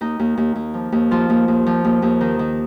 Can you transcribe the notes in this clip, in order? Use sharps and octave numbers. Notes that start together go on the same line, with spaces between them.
D#2 D#4
D#2
D#2
D#2
F3
D#2
F3 F4
D#2
D#2
F3
D#2
D#2
D#3 D#4
D#3